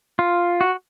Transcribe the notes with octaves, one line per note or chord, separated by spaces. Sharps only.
F4
F#4